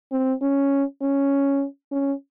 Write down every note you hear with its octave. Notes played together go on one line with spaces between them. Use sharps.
C4
C#4
C#4
C#4